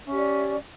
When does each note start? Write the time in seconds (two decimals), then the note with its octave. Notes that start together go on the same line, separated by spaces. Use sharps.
0.03 C#4
0.07 E5
0.11 G4
0.15 D5